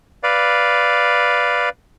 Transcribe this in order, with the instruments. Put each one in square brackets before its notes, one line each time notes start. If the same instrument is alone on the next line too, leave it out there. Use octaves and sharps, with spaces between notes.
[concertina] B4 D5 F5